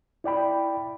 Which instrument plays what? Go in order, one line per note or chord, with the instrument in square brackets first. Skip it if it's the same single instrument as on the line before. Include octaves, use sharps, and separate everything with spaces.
[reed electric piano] E4 D5 G5 B5